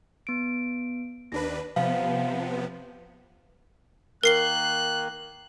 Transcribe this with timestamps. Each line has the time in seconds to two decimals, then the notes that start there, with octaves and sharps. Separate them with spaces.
0.27 B3 D7
1.32 D#2 D4 B4 A#6
1.76 C3 F3 B3 F5
4.23 D#3 A#3 A#4 F#6 C7 G7